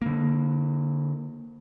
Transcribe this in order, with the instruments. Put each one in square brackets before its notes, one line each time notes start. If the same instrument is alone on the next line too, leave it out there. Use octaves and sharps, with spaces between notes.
[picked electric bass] D3 A#3